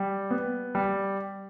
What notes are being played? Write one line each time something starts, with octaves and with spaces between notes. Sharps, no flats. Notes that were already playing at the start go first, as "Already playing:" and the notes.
Already playing: G3
B3
G3